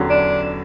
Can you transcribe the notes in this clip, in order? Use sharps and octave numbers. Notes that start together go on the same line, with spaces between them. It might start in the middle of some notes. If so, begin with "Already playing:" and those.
Already playing: E2 D3 F#3 C#4 G4
D4